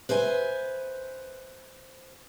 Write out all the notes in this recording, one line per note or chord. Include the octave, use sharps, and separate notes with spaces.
B4 C5 E5 G#5